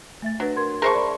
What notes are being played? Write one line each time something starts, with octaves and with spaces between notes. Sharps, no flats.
A3 E5 A6
F#3 D4 B4
A#4 C6 G#6
G#4 A#4 C5 E5 A5 C#6
D5 B5